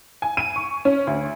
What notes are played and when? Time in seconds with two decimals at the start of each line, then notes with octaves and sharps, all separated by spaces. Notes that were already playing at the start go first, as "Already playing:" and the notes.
0.22 G#5
0.37 D#7
0.56 C#6
0.85 C#4
1.07 D2